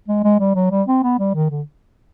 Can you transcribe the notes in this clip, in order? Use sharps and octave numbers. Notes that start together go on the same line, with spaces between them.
G#3
G#3
G3
F#3
G3
C4
B3
G3
D#3
D3